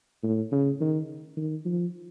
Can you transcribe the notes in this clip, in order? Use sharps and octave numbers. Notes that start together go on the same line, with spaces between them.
A2
C#3
D#3
D#3
F3